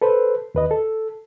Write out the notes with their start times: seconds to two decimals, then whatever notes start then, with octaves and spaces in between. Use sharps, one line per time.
0.02 A4 B4 C5
0.55 D#2 B4 D#5
0.71 A4